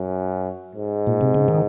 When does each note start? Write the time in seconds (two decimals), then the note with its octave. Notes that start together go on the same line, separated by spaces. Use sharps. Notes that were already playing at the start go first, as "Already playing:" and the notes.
Already playing: F#2
0.75 G#2
1.07 A#2
1.21 C3
1.34 C#3
1.48 D#3